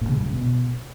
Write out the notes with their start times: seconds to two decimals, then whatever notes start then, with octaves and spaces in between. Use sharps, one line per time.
0.01 A#2
0.09 C#3
0.17 G2
0.25 C#3
0.32 B2